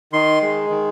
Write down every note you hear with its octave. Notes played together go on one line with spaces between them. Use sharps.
D#3 C6
G#3
D#3